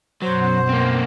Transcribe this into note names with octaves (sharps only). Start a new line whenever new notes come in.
F#2 B2 F#3 C5 F#5
A#3 C4